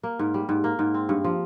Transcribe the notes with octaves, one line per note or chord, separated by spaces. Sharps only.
A#3
G#2
G3
G#2
A#3
G#2
C4
G2
F3